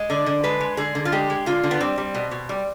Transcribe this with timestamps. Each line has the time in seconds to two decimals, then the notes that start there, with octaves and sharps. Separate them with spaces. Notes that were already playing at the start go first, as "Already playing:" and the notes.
Already playing: G#3
0.10 D3 D4
0.26 D3
0.44 G#3 B4
0.61 G#3
0.77 D3 G#4
0.95 D3
1.05 F4
1.12 G#3 G4
1.30 G#3
1.46 D3 F4
1.64 D3
1.71 B3
1.80 G3 C4
1.98 G3
2.15 B2
2.31 B2
2.49 G3